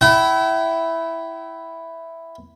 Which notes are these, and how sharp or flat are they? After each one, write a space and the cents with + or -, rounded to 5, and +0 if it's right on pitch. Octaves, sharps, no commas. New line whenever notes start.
E4 +0 G5 -45